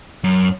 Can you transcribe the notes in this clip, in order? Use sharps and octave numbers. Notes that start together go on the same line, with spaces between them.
F#2